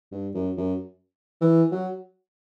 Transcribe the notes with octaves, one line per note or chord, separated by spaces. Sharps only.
G2
F#2
F#2
E3
F#3